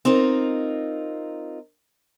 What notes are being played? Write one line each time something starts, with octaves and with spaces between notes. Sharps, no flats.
C4 D#4 F4 A#4